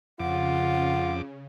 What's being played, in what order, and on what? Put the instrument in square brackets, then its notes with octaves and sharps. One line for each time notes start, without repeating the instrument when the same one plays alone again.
[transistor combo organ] F2 D6 [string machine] C#3 [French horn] F4 [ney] F#5